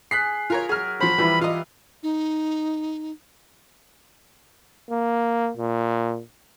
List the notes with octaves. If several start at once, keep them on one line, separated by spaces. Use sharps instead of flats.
G#4 F#6 B6 C7
F4 A#4 C#5
F#3 G#4 A#4 F6
F3 C5 B5
E3 F3 G3 E4 D5
F4 D#5
D#4
A#3
A#2